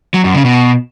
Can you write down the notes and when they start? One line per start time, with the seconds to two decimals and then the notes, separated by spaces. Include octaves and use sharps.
0.14 F#3
0.24 F#2
0.35 C#3
0.45 B2